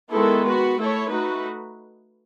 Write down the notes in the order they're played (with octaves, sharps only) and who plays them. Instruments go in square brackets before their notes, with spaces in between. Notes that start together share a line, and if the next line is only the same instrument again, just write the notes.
[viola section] D#3 G#3 B3 E4 A4
B3 F#4 B4
A3 E4 A4 C#5
A3 D#4 F#4 B4